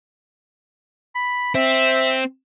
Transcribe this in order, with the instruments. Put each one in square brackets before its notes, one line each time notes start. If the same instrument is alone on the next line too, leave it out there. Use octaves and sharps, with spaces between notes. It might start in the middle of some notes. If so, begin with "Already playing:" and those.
[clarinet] B5
[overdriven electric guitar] C4 [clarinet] E5